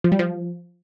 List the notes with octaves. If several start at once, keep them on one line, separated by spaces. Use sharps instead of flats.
F3
G3
F3